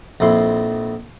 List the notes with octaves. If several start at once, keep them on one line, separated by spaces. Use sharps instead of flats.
A#1 F2 E4 C6